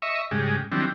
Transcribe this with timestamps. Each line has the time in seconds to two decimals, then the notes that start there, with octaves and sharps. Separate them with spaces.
0.02 D#5 E5 C#6
0.31 G#2 C#3 G3 G#3
0.72 D#3 F#3 G3 C4 D4 E4